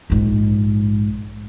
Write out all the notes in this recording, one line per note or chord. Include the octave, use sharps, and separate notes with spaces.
A#1 G#2